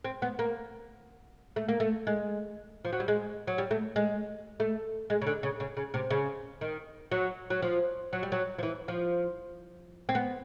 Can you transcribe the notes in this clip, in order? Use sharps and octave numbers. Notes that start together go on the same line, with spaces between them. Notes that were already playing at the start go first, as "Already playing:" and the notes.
C4
B3
A#3
A3
A#3
A3
G#3
F3
F#3
G3
G#3
F#3
G3
A3
G#3
A3
G#3
C#3
D3
C#3
C#3
C#3
C3
C#3
D#3
F#3
F#3
F3
F#3
G3
F#3
F3
E3
F3
C4
B3